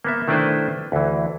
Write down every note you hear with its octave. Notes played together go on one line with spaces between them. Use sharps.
A#3 B3 E5
D#3 A3 D4 E4 B4 C5
D2 E3